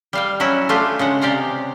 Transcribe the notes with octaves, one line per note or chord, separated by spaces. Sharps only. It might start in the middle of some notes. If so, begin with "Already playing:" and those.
G3 F5 G5
F#3 C#4 E4 F#4
A3 D4 F4 G4
C#3 G#3 F#5
C3 G4 D5 F5 A#5